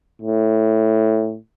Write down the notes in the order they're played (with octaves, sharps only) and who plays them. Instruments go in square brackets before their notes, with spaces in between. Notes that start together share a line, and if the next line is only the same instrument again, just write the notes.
[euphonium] A2